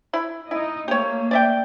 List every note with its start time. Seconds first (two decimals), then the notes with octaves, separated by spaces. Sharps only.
0.13 E4 B5
0.51 D#4 E4 D#5
0.88 A3 A#3 G4 C#5
1.31 D5 E5 G5